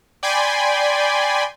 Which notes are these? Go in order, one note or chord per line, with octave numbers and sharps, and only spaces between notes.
D5 G5 G#5 B5 C6